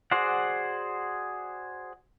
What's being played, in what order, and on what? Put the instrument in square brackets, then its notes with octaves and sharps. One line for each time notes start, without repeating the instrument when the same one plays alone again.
[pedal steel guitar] F#4 G#4 C5 D5 F#5